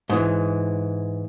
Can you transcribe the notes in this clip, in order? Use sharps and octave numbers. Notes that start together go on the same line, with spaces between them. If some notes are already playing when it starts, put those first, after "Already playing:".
G#2 E3